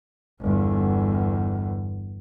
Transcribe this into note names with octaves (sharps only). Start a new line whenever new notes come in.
G1 E2